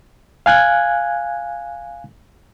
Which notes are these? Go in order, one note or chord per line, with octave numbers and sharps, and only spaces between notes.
F5 G#5 F#6 G#6